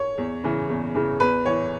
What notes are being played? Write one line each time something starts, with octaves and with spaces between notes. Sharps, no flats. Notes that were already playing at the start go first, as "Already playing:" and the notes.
Already playing: C#5
E2
C#3 E3
E2
C#3 E3
E2 B4
E3 C#5